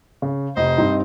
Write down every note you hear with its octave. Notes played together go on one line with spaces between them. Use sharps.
C#3
F1 C5 D#5
G2 C4 D#4